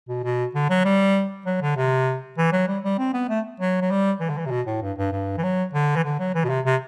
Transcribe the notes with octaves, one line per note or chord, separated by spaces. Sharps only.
B2
B2
D3
F#3
G3
F#3
D3
C3
E3
F#3
G3
G3
C4
B3
A3
F#3
F#3
G3
E3
D3
E3
C3
B2
A2
G2
G2
G2
E3
F#3
D3
E3
D3
F#3
E3
B2
C3
C3